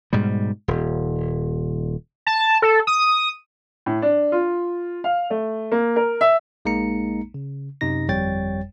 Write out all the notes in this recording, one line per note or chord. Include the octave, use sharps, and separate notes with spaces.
G#2 B2 G3
D#1
A5
A4
D#6
A2
D4
F4
F5
A3
A#3
A#4
E5
A#1 G#3 A#3 D#4 A#5 C#7
C#3
F#2 C3 D#4 A#6
G1 F2 G3 C#5 G5 A6